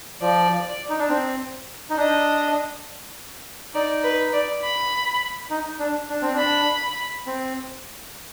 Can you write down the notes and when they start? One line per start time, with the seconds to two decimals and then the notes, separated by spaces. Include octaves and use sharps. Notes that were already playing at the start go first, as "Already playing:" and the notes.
0.21 F3 D5
0.90 D#4
0.99 D4
1.09 C4
1.90 D#4
1.97 D4 D#5
3.74 D#4 D5
4.03 B4
4.33 D5
4.63 B5
5.50 D#4
5.79 D4
6.09 D4
6.22 C4
6.34 D4 B5
7.27 C4